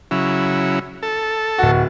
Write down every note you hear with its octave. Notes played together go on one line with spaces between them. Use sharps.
C#3 F#3 E4
A4
D1 F#4